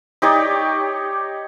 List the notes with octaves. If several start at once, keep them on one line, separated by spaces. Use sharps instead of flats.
D#4 G4 C#5 D5